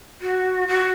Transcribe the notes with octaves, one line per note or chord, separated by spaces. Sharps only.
F#4
F#4